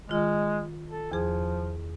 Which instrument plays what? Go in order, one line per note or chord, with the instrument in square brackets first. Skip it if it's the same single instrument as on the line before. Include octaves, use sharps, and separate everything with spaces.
[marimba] D#3 F4 [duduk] G#3
[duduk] A4
[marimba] E2 G#4 [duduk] F3